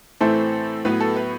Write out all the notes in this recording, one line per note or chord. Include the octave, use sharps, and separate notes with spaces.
A2 E3 A3 C4 A4 C5
A2 F#3 B3 B4
A4
B4